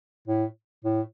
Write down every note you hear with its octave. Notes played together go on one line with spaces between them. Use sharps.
A2
A2